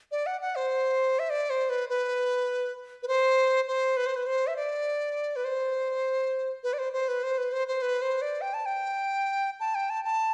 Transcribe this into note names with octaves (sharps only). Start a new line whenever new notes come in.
D5
F#5
F#5
C5
E5
D5
C5
B4
B4
B4
C5
C5
B4
C5
B4
C5
E5
D5
B4
C5
B4
D5
C5
C5
B4
C5
B4
C5
C5
B4
C5
D5
G5
A5
G5
A5
G5
A5
A5